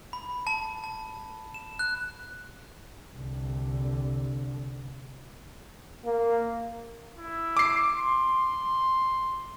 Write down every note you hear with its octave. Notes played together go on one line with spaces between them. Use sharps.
B5
A5
A5
E7
F#6
C2 D3
A#3
E4
D6 C7
C6